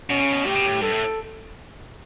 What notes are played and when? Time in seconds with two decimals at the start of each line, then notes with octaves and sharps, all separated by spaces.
0.10 B2 C#4
0.20 C#3
0.32 B2
0.45 A2 G4
0.55 B2
0.64 A2
0.81 G2 A4
0.92 A2